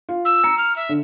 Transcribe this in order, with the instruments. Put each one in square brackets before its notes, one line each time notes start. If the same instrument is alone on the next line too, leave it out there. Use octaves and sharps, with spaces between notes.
[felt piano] F4
[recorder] E6
[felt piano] A#5 C#7
[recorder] F6
E5
[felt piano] D3